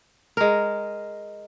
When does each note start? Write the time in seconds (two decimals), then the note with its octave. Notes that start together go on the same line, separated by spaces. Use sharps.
0.37 G#3 A#4